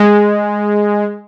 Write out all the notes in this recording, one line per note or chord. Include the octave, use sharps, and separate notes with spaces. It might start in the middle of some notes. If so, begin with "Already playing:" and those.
Already playing: G#3